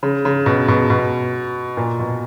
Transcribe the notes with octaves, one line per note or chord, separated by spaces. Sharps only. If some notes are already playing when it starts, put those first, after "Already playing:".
C#3
C#3
B2
B2
B2
A#2
B2